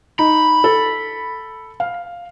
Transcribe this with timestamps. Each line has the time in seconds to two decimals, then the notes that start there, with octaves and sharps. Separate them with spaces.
0.19 D#4 B5
0.64 A4
1.80 F5